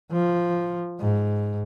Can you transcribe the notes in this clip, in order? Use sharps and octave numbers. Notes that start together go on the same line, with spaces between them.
F3
G#2